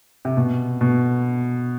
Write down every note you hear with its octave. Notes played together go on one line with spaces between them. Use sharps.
C3
B2
B2